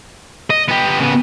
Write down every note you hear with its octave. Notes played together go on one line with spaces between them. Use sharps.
D#5
B3 G4
C#3 B3